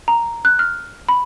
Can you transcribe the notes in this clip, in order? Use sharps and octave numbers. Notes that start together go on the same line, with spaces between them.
A#5
F#6
F6
B5